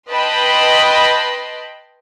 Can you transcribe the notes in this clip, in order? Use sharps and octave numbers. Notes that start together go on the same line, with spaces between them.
B4 D#5 G5 A5 B5 C6